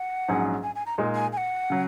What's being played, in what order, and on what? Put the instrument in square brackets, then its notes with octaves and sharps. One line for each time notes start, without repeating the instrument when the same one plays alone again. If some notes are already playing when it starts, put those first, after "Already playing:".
Already playing: [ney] F#5
[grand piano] A#1 G#2 F#3 C#4 G#4
[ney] G#5
G#5
A#5
[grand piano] A#2 G#3 D#4
[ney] G#5
G#5
F#5
[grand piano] C#3 F#3